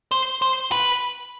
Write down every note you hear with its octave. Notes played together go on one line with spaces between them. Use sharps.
C5
C5
B4